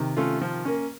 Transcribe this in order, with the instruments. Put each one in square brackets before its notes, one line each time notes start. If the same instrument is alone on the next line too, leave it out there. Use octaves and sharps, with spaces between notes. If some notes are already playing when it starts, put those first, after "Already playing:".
Already playing: [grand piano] C3 D#3
[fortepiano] A3 C#4 F4
F3
A#3 C#4